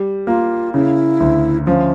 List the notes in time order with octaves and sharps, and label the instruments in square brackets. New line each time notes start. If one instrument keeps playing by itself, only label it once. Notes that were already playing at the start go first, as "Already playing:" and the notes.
Already playing: [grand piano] G3
[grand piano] A#3 [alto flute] F4
[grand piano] C#3 [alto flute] E4
[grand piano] D2
[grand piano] F3 [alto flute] C#4